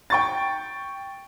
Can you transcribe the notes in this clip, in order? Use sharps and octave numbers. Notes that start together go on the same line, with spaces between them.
G5 C#6 A6